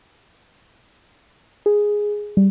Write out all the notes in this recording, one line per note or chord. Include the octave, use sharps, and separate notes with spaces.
G#4
G3